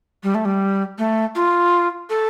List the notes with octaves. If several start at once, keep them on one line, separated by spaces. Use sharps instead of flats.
G3
A3
G3
A3
F4
A4